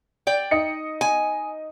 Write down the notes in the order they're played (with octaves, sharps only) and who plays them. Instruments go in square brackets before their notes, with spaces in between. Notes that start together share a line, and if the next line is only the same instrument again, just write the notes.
[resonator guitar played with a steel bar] D5 G5
[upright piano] D#4 D#5 C#7
[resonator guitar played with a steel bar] G#5